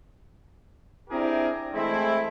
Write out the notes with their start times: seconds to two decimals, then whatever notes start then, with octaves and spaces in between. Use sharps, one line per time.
1.10 C4 D4 E4 G4 G#4 A#4
1.74 E3 G#3 A3 C4 E4